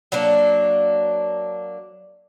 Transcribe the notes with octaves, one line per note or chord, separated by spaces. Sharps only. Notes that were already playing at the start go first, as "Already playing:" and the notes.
F#3 A#3 D4